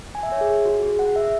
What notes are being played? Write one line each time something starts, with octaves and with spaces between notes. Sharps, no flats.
G#5
E5
C#5
G#4
F#4
G#4
F#5
E5